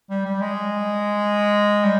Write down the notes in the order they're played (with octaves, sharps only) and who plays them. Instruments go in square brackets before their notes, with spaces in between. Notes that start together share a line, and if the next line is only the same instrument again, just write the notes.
[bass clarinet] G3
G3
G#3
G3